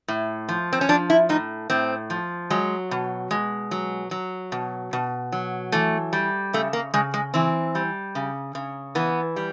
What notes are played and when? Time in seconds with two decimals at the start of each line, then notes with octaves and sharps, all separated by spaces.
0.08 A2
0.49 F3
0.73 C4
0.81 C#4
0.89 F3 D4
1.10 E4
1.29 A2 D#4
1.70 A2 C4
2.10 F3
2.50 F#3 G#3
2.91 B2
3.31 B2 G#3
3.71 F#3
4.11 F#3
4.52 B2
4.93 B2
5.32 F#3
5.72 E3 A3
6.13 G3
6.53 C#3 A3
6.73 A#3
6.94 C#3 G#3
7.14 G#3
7.34 E3 C4
7.75 G3
8.15 C#3
8.55 C#3
8.95 E3 B3
9.36 G3